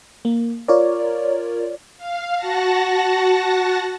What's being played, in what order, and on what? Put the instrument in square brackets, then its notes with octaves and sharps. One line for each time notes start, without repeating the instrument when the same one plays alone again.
[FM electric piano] A#3
F4 A#4 C#5 D5
[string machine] F5
F#4 F#5 A5 A#6